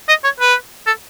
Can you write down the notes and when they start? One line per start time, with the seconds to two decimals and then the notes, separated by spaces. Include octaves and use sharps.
0.09 D#5
0.24 C#5
0.40 B4
0.86 A4